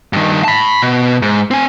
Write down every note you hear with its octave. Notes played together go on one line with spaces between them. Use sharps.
G2 D#3
A5 B5
B2
G#2
C4 G#5